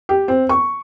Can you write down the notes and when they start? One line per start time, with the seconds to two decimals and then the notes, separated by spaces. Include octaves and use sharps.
0.09 G4
0.28 C4
0.49 C#6